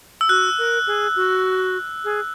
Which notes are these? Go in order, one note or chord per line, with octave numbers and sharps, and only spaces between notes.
E6
F#4 F#6
A#4
G#4
F#4
G#4